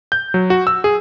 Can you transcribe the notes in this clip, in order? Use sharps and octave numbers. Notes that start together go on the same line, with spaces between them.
G6
F#3
F#4
E6
G#4